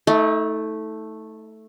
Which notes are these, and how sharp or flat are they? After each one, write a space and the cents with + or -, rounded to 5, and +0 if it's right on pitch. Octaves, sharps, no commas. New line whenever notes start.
A3 +0 D#4 +40